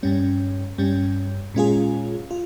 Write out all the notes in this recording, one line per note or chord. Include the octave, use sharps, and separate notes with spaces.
G2 G3 C#4
G2 G3 C#4
A#2 G#3 C#4 F4 G#4
F4